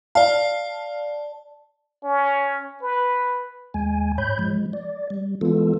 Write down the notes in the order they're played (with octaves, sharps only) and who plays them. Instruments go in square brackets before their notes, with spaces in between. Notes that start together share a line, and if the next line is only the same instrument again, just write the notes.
[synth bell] D5 A5 [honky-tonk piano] F5
[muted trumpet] C#4
B4
[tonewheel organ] D#2 G#3 G#5
G#2 C#5 B5 G6
F3 G#3
D5
G3
E3 G#3 B3 F4 A4